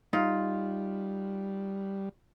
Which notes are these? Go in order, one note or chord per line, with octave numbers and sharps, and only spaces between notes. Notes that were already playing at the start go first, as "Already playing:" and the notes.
G3 D#4 F4